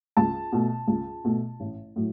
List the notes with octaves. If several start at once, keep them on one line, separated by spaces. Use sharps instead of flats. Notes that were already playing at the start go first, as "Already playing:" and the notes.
C#2 A5
B2 A3
C#2
B2 A3
A1
A2 F#3